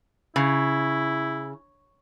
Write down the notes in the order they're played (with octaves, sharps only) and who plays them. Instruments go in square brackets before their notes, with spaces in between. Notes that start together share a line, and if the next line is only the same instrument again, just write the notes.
[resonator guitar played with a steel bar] C#3 [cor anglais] E4